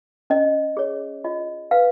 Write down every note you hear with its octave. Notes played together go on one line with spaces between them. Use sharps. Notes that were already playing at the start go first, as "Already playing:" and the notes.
C#4 D#5
G#4 C#5
F4 D#5
B4 F5